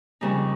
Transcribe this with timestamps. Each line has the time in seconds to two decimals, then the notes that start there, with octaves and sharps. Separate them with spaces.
0.21 F2 C#3 G3 A#3 D#4